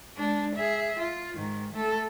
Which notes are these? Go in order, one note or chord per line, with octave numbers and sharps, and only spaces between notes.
G#3 D4
G#4 E5
F4
G#2 D#3
A3 A4